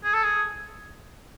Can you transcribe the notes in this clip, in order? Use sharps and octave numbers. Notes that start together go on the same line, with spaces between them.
G#4
A4
G#4